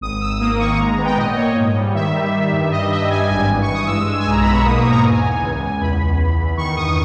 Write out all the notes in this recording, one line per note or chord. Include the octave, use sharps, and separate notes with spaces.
G#1 D#6
G#1 E6
A#3 D#6
D#3 C#6
G#3 A#5
B3
G5
A#2 D#5
A#3 C#5
G#2
G3
D#3 E5
G3
D#3
G2
G3 D#5
G2 E5
G3 G#5
G#1 G#5
E3
C#6
G2
D#6
G#3 E6
G#3
G#5
B1 A#5
B2 B5
C#6
A#3 D#6
C#6
G#2
A#5
E2 G#5
E2
C#2
C#2
E2 B5
E2
E2
E2
D#3 C#6
G2 D#6